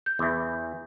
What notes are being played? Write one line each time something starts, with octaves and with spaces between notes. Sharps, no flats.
G6
E2 E3